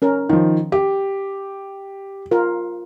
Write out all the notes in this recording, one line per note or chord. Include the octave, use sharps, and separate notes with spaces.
C#4 A#4
D#3 F3
G4
F4 A#4